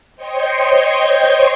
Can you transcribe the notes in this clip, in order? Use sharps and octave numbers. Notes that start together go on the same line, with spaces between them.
C5 C#5 D#5 G5 C6 C#6